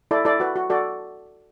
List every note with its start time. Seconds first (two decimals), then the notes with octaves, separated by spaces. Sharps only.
0.11 E4 A4 D5
0.25 E4 A4 D5
0.40 F#4 B4
0.56 F#4
0.70 F#4 A4 D5